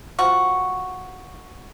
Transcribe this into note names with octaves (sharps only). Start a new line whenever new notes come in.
F3 F#4